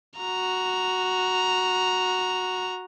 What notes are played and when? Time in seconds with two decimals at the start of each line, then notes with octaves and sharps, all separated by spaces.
0.18 F#4 A#5